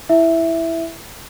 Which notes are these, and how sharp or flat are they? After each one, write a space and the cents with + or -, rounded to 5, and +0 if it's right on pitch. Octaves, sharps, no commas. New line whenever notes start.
E4 +0 E5 +0